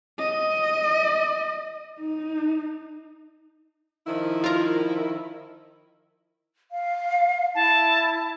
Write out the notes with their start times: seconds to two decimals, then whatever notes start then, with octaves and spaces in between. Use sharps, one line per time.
0.19 D#5
2.00 D#4
4.06 D#3 F3 E4
4.44 F4 A#4
6.71 F5
7.55 E4 A5